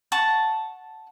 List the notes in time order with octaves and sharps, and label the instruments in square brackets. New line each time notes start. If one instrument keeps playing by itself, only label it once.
[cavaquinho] F#5 A5 C#6